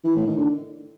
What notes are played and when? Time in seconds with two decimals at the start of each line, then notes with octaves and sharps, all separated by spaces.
0.04 E3
0.15 A2
0.26 D#3
0.37 D3